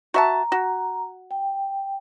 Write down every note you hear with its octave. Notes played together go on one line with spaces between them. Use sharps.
F#4 E5 A5 A#5
F#4
G5